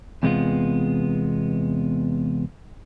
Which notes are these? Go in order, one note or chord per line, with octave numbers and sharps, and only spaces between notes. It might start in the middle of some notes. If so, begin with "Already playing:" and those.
E2 C3 G#3 B3 F4